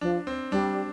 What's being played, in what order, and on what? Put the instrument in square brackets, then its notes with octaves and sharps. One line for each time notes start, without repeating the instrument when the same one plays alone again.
[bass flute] F3 [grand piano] D4
[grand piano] C4
[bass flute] G3 [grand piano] D4